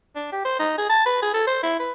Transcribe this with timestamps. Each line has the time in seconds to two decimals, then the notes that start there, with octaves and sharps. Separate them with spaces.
0.15 D4
0.32 G4
0.45 C5
0.59 D#4
0.78 G#4
0.89 A5
1.06 B4
1.22 G#4
1.34 A4
1.47 C5
1.63 E4
1.80 B4